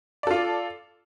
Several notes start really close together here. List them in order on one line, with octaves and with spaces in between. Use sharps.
D5 A4 F4